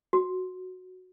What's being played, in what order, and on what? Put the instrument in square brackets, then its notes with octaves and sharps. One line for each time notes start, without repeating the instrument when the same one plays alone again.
[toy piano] F#4